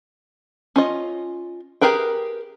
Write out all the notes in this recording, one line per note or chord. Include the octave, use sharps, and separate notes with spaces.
C#4 F4 D#5
G4 G#4 A#4 B4 G5